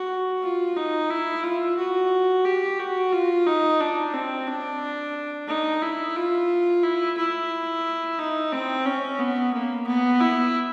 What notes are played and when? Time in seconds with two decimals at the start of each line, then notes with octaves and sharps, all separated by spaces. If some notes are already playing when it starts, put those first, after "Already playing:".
Already playing: F#4
0.42 F4
0.76 D#4
1.10 E4
1.44 F4
1.77 F#4
2.45 G4
2.79 F#4
3.12 F4
3.46 D#4
3.80 D4
4.14 C4
4.47 D4
5.49 D#4
5.82 E4
6.16 F4
6.83 E4
7.17 E4
8.19 D#4
8.52 C4
8.86 C#4
9.20 B3
9.54 A#3
9.87 B3
10.20 E4